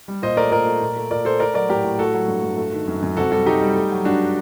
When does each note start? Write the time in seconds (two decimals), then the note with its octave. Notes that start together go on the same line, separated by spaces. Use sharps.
0.08 G3
0.22 A#2 C5 D#5
0.37 A3 A#4 D5
0.51 A#2 A#4 D5
0.67 A3
0.81 A#2
0.96 A3
1.11 A#2 A#4 D5
1.25 A3 A4 C5
1.40 A3 A#4 D5
1.54 F#3 A#4 D5
1.69 A2 G4 A#4
1.85 A2
1.99 A3 F#4 A4
2.14 F#3
2.28 G2
2.44 G2
2.58 A3
2.73 D#3
2.88 F#2
3.03 F#2
3.17 C3 F#4 A4
3.32 G3 F#4 A4
3.46 C3 D#4 G4
3.62 G3
3.76 A3
3.91 F#3
4.05 G2 D4 F#4